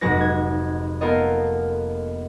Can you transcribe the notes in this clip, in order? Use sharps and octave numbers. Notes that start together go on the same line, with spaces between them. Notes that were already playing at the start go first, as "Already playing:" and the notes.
F1 G#2 G#3 F#4 B4 A#6
G#6
A#3 B3 F4 A4 A#4 D#5